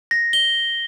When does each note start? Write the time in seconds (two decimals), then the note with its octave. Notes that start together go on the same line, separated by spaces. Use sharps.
0.11 A#6
0.33 G7